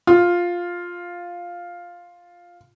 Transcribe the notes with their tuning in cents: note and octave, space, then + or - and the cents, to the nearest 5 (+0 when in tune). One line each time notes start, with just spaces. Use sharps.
F4 +5